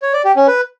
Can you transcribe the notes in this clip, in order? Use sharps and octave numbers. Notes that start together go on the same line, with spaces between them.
C#5
D5
G4
C#4
B4